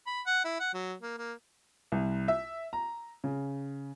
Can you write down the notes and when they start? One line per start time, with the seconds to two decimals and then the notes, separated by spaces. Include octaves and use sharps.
0.07 B5
0.26 F#5
0.45 E4
0.60 F#5
0.74 F#3
1.02 A#3
1.18 A#3
1.92 C2
2.28 E5
2.73 A#5
3.24 C#3